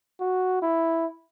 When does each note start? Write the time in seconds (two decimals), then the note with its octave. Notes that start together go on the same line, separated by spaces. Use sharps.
0.20 F#4
0.62 E4